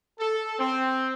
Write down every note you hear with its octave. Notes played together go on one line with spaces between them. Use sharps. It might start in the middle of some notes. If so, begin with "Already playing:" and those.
A4
C4